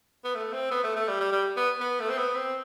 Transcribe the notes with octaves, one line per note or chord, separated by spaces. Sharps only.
B3
A3
C4
B3
A3
A3
G3
G3
G3
B3
B3
A3
C4
B3
C4